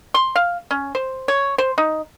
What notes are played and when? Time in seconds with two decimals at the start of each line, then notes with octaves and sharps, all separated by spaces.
0.14 C6
0.36 F5
0.71 C#4
0.95 C5
1.28 C#5
1.58 C5
1.78 D#4